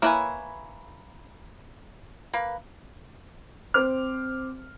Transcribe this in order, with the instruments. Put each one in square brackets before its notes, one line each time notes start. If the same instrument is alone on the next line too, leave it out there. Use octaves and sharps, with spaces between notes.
[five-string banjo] A#3 E4 C#5 [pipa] A#4 B4 G#5
[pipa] A#3 [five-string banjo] B4
[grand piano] C4 C5 D6 F6